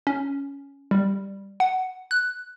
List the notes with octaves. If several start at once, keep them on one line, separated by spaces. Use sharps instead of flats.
C#4
G3
F#5
F#6